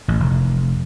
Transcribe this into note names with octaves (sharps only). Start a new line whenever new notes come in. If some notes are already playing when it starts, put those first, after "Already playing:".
A1
F1